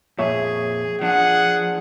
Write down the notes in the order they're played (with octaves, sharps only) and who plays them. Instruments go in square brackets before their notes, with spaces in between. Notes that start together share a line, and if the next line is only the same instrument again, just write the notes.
[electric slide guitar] F2 A#2 [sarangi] G#4 [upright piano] C#5 E5 C#6
[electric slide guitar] F3 D4 [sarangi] G#4 [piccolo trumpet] F#5